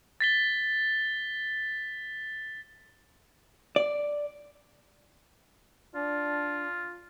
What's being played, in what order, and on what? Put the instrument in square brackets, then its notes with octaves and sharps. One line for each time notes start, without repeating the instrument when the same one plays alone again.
[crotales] A6 B6 G7
[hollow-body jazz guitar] D5
[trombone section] D4 [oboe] F4